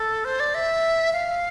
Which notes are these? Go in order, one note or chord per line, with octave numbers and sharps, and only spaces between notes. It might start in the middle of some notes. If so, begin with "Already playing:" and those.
Already playing: A4
C5
D5
E5
F5